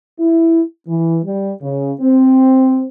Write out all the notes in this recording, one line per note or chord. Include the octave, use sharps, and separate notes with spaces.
E4
E3
G3
C#3
C4